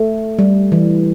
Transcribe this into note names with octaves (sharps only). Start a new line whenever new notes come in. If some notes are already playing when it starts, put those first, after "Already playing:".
Already playing: A3
G3
E3